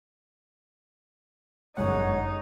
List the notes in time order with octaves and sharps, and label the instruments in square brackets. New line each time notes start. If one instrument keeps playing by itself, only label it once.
[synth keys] G1 G#3 F#5 [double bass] F#2 [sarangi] D#4 [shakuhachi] C#5